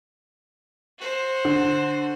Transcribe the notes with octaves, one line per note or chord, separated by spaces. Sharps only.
F#4 C5
D3